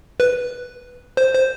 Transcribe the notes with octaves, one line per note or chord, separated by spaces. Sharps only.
B4
C5
C5